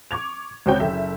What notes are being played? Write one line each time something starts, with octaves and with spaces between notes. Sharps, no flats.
C#6 D6 G#6 F7
C#2 C4 F#4 C#5 G5 G6
F#1 A4 E5